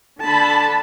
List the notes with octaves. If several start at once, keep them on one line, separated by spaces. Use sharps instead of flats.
D3 A5 B5